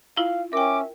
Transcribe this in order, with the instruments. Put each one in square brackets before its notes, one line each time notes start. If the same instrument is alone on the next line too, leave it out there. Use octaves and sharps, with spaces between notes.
[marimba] E4 F4 [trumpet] F5
[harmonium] C#4 [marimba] A#4 G5 [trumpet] E5 [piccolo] D6